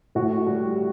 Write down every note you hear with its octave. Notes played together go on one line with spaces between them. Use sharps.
A2 F#4
G3